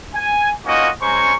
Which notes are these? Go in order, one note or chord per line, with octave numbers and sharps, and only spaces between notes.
G#5
A#3 C#4 D#4 F4 F#4 D#5
G#3 C#4 C5 A#5 C#6